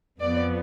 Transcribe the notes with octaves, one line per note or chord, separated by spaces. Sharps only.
F2 F3 B3 D5